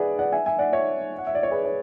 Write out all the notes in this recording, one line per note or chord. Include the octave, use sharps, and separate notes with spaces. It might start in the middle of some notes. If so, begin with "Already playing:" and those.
Already playing: G#4 B4 D5 E5 F#5 G#5
D5 F#5
E5 G#5
E5 G#5
D5 F#5
C#5 E5
F#5
E5
D5
C#5
G#4 B4
C#5